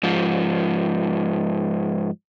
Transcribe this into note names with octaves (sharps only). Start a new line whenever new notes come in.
G#2 F3